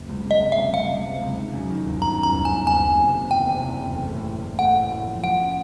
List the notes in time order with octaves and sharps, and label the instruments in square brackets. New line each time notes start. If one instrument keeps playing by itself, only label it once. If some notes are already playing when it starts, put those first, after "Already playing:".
Already playing: [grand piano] F#1
C#2
C#2
[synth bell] D#5
[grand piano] C3
[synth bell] E5
[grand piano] C#2
[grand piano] C#2 [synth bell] F5
[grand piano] C#2
C3
C#2
D#3
F#2
D#3
G1
[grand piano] D#3 [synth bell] A#5
[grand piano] F#2
[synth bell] A#5
[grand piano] G1
[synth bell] G#5
[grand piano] D#3
[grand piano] F#1 [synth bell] G#5
[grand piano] F#1
C3
C3
[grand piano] E2 [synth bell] G5
[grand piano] C3
E2
F#1
A3
A2
A2
A2
[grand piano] A3 [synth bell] F#5
[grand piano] A2
A2
F3
[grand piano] F3 [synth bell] F#5
[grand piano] C#4